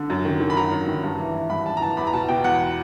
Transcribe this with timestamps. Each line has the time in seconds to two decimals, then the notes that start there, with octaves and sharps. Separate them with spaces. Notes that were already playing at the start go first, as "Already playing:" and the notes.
Already playing: D3
0.10 F#2
0.25 D#3
0.40 D#3
0.50 B5
0.56 F#2 A#5
0.71 F#2
0.88 D#3
1.03 G2
1.20 E3
1.35 E3
1.50 G2 B5
1.66 G2 A5
1.77 A#5
1.82 E3 A5
1.97 E2 B5
2.07 A#5
2.13 B2 A5
2.29 B2 G5
2.44 E2 F#5